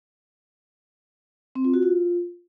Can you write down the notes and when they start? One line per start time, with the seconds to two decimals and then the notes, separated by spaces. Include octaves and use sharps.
1.55 C4
1.65 F4
1.74 F#4
1.83 F4